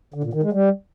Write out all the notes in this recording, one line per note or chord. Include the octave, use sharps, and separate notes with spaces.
D3
A#2
D#3
G#3
G3